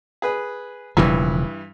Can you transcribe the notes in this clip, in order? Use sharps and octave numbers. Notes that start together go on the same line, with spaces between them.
G#4 B4
E1 G2 C#3 E3 F3